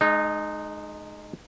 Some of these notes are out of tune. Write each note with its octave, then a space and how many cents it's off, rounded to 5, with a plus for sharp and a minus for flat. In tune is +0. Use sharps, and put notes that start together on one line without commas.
G#3 +25 D#4 -20